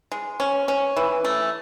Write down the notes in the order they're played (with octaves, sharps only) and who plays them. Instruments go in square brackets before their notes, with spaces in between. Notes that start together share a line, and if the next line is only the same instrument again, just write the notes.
[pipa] G#3
C#4
C#4
E3
A3